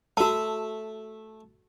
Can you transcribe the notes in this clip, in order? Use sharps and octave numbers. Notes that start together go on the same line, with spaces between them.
A3 F#4 E5 A5